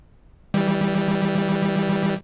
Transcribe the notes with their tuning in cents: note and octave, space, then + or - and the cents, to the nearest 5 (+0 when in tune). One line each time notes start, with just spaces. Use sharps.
E3 -20 G3 +0